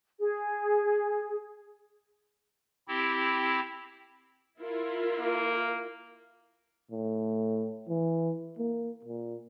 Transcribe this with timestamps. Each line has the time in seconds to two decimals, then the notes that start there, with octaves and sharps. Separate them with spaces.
0.20 G#4
2.88 C4 E4 G4
4.61 E4 F4 A#4
5.20 A#3
6.91 A2
7.89 E3
8.58 A#3
9.05 A#2